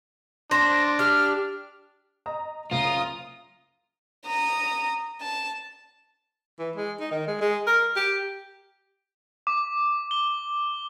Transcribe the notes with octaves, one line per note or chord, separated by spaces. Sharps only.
D4 C5 A#6
G4 F6
D#5 A#5 D#6
F#1 C#2 F4 A#5 D#6 D7
A#5 D#6
A5
E3
G#3
D#4
D#3
G#3
G#3
A#4
G4
D6
G7